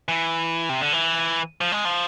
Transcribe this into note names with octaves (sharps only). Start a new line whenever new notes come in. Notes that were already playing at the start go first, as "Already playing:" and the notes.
E3
C3
D3
E3
F3
G#3
F3